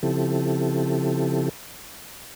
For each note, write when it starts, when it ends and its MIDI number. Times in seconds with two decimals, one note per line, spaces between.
0.03 1.49 49
0.03 1.49 53
0.03 1.49 60
0.03 1.49 64
0.03 1.49 67
0.03 1.49 69